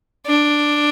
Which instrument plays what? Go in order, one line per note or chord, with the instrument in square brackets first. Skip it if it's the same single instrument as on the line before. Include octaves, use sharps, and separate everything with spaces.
[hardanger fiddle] D4